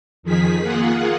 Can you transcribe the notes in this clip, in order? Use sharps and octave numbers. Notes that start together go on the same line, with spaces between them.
F2 D#3 F3 G#4 B6
A#3 F4 G#4 F#5